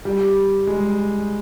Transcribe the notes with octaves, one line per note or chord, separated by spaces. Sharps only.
G3
G#3